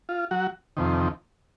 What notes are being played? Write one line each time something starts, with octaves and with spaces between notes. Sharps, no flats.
F4
F#3 F#4
F2 C3 D#3